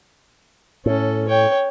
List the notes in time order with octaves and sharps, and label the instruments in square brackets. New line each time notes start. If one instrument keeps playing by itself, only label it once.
[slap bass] A2 [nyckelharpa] C#4 A4
[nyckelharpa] C#5 G5